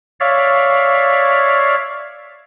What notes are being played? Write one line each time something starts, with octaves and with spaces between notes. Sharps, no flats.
C#5 D5 E5 F5